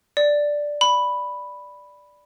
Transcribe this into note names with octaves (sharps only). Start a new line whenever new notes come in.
D5
B5